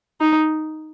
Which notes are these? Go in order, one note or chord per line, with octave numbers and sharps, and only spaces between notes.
D#4